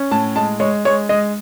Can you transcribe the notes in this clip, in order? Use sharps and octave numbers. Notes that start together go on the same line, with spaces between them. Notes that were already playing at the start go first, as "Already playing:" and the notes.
Already playing: C#4
A2 A5
G#3 A5
G#3 C#5
G#3 C#5
G#3 D#5